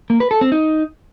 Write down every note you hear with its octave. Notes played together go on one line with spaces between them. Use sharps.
A#3
B4
A4
C4
D#4